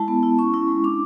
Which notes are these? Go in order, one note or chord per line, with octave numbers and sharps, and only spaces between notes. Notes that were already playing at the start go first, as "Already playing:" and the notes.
Already playing: G#3 E4 A5
B3
E4
C#4 C#6
E4
G#3
D4 D6